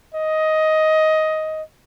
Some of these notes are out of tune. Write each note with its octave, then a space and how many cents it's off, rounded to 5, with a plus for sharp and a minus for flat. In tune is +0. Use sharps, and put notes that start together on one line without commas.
D#5 +10